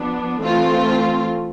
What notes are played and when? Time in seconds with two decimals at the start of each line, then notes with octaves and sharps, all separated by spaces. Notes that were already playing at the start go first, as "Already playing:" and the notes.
Already playing: F3 B3 D4
0.40 E3 A3 C4 F4